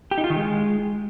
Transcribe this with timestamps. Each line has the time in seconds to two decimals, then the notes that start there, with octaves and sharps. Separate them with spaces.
0.11 G4
0.18 D#4
0.24 F4
0.30 D#3
0.36 G#3